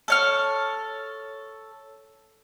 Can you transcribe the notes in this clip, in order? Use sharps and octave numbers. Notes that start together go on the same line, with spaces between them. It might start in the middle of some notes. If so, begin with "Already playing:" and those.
A4 C#5 F6